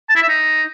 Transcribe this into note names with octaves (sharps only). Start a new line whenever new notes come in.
A5
E4
E5
D#4